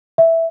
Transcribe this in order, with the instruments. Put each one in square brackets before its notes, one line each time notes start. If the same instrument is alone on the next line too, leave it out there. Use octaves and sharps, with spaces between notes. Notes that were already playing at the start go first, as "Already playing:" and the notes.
[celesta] E5